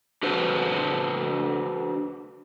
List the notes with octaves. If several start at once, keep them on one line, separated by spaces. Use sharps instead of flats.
D4 F#4 B4 C5